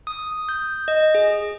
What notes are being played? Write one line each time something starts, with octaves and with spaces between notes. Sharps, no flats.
D#6
G6
D#5
G#4